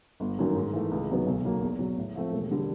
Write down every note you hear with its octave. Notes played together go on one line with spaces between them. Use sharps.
G1
F#2 D#3 F#3
G#2
E3 A3
C#2
C3 D#3 F#3 B3
B1
B2 F#3 A#3
E2
B2 F#3
A2
F3 A3 C4
E1
D3 G3